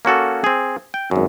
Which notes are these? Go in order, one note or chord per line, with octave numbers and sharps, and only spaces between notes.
A#3 C#4 F#4 A4
C4 G#4
G5
G#1 F#2